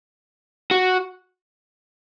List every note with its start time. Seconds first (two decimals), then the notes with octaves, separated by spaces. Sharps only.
0.71 F#4